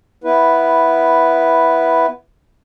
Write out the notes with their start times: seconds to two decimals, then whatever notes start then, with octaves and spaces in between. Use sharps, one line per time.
0.24 B3 E4 B4